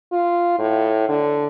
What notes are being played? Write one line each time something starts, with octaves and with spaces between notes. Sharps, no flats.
F4
A2
D3